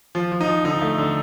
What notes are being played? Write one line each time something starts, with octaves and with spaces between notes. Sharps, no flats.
F3
F3
D#4
F3
D3 D#4
A3
D3